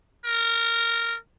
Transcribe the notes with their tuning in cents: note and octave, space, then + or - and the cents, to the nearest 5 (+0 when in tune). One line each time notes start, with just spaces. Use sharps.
A#4 -10